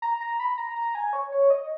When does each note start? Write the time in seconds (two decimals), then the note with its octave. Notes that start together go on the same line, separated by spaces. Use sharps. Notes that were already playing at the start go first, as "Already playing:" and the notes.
0.02 A#5
0.21 A#5
0.40 B5
0.58 A#5
0.76 A#5
0.95 G#5
1.13 C#5
1.32 C#5
1.50 D#5